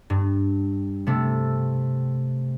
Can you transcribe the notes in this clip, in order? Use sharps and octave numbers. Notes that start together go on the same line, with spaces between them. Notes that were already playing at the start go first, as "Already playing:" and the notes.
G2
C3 A3